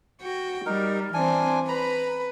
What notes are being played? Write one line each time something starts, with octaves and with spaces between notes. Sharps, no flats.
F#4 G5
G3 D#4 A#4
E3 C4 D4 G#5
B4 A#5 B5